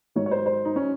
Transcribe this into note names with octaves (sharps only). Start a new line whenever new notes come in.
G#2 D#3 F#3 C#5
C#5
C5
C5
D#4
F#3 C#4